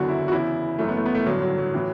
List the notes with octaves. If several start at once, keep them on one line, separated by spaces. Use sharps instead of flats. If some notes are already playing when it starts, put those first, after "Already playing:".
Already playing: F#1 E2 D3 F#3 F#4
E4
F#4
E2 C#3 E3 E4
F#1 F#2 E3 A3
B3
A3
B3
A3
A1 G2 D3 F#3
F#3
F#3
A2 E3